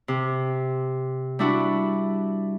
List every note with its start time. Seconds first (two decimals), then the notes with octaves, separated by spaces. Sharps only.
0.08 C3
1.39 G3 D4 E4 F#4 D5